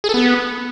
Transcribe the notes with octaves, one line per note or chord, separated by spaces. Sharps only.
G#4
A4
B3